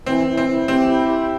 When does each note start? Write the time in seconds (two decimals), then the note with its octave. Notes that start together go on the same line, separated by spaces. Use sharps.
0.06 E3 C4
0.28 E3
0.37 C4
0.48 E3
0.68 C4 G4
0.89 E4
1.09 G4